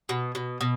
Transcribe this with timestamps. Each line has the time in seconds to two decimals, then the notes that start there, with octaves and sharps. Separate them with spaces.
0.09 B2
0.35 B2
0.61 B2